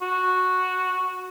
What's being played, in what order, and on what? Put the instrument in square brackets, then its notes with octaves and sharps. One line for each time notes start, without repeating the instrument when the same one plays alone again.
[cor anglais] F#4